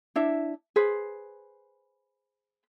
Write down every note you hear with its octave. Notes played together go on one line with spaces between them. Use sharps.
D4 E4 E5
G#4 B4 C5